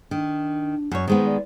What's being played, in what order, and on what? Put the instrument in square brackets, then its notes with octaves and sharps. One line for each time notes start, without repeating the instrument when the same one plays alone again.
[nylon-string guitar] D#3 [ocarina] D4
[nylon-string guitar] F#2 C#5
[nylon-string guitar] D#3 G#3 B3 [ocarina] C5
[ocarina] D5